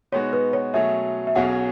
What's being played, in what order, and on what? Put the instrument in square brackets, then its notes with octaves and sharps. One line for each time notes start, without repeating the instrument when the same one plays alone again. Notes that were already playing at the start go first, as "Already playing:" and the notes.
[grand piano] B2 G#3 B3 D#4 F#4 [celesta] C#5
[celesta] B4
C#5
[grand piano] B2 F#3 A3 C#4 G#4 [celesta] E5
[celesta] E5
[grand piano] B1 B2 F#3 C#4 G#4 [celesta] F#5